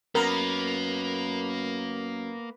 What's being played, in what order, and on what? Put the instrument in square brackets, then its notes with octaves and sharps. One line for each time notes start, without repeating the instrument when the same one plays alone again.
[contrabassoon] F#2 [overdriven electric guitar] A#3 [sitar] B3 [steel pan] A#4